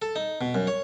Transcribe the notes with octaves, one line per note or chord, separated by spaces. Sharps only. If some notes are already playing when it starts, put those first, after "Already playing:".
A4
D#4
B2
F#2
C#5